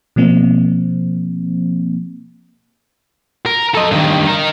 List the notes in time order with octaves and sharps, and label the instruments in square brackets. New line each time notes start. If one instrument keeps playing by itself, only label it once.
[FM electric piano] B2 F3 A#3 C4
[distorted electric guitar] A#4
A4 D#5
G2 D#3
D#4 A#4